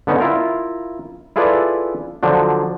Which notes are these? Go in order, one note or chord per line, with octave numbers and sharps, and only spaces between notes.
D3 B3 C#4 D#4
E4 F4 A#4
E4 F4 G#4 A4 B4 D5
D3 F3 F#3 D4